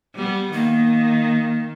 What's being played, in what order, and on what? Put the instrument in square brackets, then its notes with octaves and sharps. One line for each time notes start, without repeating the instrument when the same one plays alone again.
[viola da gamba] G3 B3
[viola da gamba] D#3 [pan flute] A#3